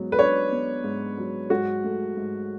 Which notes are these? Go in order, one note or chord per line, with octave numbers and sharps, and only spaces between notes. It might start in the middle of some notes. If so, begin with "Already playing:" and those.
Already playing: G#2 F#3 B3
B4
D4 C#5
B3
G#2
F#3
G#2 F#4
A3
G#2